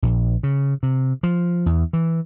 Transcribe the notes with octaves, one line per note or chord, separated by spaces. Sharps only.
A#1
C#3
C3
F3
E2
E3